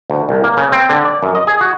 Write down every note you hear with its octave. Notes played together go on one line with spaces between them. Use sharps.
D2
C2
A#3
C#3
C4
D3
D5
F#2
D#5
G#4
F#4